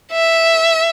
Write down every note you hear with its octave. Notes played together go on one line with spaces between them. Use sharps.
E5